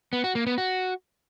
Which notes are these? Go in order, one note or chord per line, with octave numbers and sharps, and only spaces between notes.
B3
F#4
A#3
B3
F#4